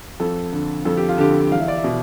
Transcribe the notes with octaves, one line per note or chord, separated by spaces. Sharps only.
F2 A4
D3
F2 A4
G4
F4
D3 G4
E2 F5
E5
D5
E5
B2